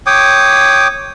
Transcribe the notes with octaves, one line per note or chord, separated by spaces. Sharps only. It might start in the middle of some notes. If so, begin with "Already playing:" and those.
C#5 G5 D6 D#6